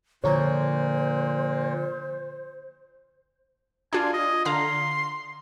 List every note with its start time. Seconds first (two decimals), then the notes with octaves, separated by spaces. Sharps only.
0.24 A#2 D3 F3 C5 C#5 A#5
3.93 D4 F4 G#5
4.14 D#5
4.45 D3 F5 A#5 C6